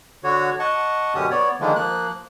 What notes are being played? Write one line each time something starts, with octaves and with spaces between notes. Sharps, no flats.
D3 F#4 C#5
D#5 F#5 A5 C#6
F#2 B2 D3 C#4 G4 D#6
B3 C#5 D5
D3 D#3 F3 G#3 A#3
F3 A#3 F#6